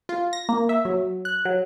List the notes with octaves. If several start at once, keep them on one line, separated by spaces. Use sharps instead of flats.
F4
A#6
A#3
E5
F#3
F#6
F#3